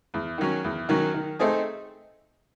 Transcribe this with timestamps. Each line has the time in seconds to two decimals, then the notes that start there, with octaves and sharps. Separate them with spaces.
0.14 E2
0.38 D#3 F#3 C#4
0.64 E2
0.89 D#3 F#3 C#4
1.14 D#3
1.39 A3 C4 D#4 G#4